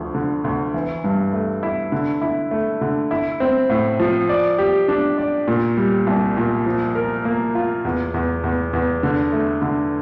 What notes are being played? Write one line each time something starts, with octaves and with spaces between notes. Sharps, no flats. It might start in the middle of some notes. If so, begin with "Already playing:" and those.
Already playing: D2 F3
D3
D2
E3
G2
A3
E4
D3
E4
A3
D3
E4
C4
A2
F3
D5
G4
D4
D5
A#2
G3
C2
A#2
F3
A#4
A#3
F4
E2
E2
E2
E2
D3
A3
D3